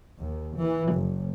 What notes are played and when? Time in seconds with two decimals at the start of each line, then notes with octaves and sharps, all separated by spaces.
0.20 D#2
0.57 E3
0.93 F#1